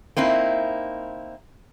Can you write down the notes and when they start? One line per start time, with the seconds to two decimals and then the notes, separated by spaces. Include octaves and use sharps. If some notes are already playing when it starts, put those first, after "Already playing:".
0.17 A#3 C4 D#4 E4